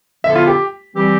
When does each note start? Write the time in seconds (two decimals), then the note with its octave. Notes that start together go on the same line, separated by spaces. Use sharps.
0.24 D3 F3 B3 E4 A4 E5
0.35 F4
0.47 G4
0.95 E3 G3 C4 G4